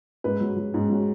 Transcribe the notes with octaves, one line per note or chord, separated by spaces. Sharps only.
G#2 B4
F#3
F#3
G#2
F#3